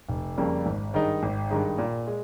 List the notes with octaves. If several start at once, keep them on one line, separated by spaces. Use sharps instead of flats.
F1
F2 C#3 G3 A#3
G#1
G2 D#3 G#3 D#4
G#1
G2 D#3 G#3 D#4
A#2
G#3